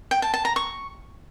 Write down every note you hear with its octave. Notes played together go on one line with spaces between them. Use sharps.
G5
A5
A5
A#5
C#6